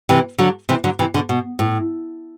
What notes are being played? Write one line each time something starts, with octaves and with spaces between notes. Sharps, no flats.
C3 E3
D3 F#3
C3 E3
D3 F#3
C3 E3
B2 D3
B2
A2